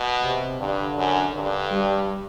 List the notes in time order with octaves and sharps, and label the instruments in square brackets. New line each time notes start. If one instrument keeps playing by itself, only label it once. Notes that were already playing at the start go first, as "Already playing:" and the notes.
Already playing: [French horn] B2
[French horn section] C3
[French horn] G2 [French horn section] D3
[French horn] F#2
[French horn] G2 [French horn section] D3
[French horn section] G3